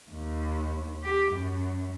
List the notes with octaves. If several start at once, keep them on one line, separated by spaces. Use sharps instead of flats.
D#2
G4
F#2